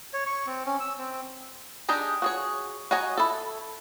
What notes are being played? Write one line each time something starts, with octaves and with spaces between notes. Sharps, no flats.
C#5
C#6
C4
C#4
E6
C4
D4 D#4 G4 G#4 A#5
F#4 G#4 C#5
F#4 C#5 D#5 G#5 A#5
E4 A4